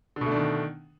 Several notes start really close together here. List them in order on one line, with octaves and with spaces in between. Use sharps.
D3 B2 A3 D4 D#3